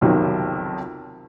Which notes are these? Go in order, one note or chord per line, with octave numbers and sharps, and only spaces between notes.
F#1 B1 F2 C3 D#3